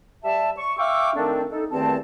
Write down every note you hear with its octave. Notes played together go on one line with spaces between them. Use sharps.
G3 E5 A5
C#6
E5 F5 G5 C#6 D6 E6
D#3 A3 C4 D4
D#4 A4
E2 G2 D#3 A3 C4 A5